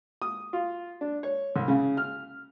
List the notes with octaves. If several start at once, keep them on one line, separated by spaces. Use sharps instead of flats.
D#6
F4
D4
C#5
C2
C#3
F6